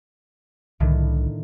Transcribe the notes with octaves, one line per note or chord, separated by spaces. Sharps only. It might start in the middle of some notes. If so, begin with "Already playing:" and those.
C2 A2 D3 D#3